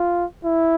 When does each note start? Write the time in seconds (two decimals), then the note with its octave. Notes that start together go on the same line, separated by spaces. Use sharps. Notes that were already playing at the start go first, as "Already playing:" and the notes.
Already playing: F4
0.45 E4